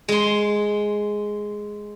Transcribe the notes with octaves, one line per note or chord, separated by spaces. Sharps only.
G#3 C6